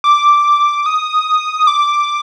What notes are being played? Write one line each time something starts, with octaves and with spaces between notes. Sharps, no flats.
D6
D#6
D6